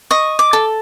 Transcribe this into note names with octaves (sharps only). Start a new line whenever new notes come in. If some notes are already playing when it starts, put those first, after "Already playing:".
D#5 C#6
D6
A4